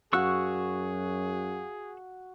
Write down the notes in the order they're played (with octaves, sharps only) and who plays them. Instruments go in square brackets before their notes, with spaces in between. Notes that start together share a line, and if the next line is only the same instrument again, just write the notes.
[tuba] F#2 [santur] F#4 F5 F#5 [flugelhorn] G#4 [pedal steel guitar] C#6 E6 F#6